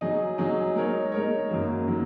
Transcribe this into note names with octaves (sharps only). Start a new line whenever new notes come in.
F#3 D#4 G#4 D#5
F#3 D#4 G#4 D#5
G#3 D#4 A#4 C#5
G#3 D#4 A#4 C#5
F#2 D#3 F#3 A#3
D#3 F#3 A#3